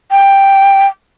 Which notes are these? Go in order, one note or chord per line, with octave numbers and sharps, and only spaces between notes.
G5